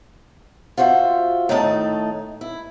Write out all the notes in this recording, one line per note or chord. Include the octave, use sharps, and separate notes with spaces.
F4 F#4 C5 D#5 E5
A2 D#3 A3 D#4 C#5 A5
E4